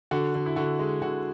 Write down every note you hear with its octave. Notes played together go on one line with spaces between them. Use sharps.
D3 F#4
D3
E4
D3 F#4
G#3
D3 F#4